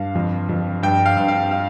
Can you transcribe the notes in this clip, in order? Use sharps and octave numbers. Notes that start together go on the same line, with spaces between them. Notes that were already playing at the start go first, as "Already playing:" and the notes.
Already playing: G2 F5
F2
F2
G2 G5
F5
G2
F5
F5